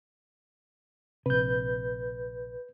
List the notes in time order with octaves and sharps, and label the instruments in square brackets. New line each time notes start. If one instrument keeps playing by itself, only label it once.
[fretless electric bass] A#1 C3 [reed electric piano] B4 G6